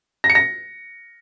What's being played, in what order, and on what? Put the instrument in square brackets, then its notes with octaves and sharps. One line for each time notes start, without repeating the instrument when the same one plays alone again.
[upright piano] A#6
C#7
A#6